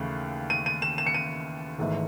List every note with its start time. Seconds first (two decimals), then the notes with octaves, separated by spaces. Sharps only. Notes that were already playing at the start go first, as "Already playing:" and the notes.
Already playing: D#2 C#3 E3 A3
0.50 D#7
0.66 D#7
0.82 E7
0.98 E7
1.06 C#7
1.14 D#7
1.78 G#1 G#2 E3 A3